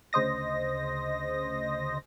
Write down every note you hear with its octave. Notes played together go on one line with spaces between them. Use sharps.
D2 C#3 C5 D#5 A#6